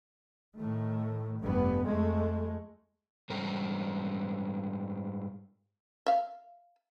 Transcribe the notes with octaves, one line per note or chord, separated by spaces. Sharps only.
A2 D#3 A3
F1 G2 B3
F2 G#3 A3
G#2 G3 A#4
E5 F5